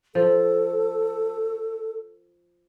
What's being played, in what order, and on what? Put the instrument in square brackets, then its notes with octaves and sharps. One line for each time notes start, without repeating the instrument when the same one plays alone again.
[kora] F3 [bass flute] A4